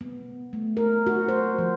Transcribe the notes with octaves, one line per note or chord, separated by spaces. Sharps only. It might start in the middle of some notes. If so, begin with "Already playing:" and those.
B3
A3
A#4
F#4
C5
F3